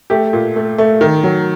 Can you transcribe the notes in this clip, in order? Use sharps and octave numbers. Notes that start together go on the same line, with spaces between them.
A3 G4
A#2
A3
A3
D#3
F#3